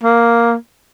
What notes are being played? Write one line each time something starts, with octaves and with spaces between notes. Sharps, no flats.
A#3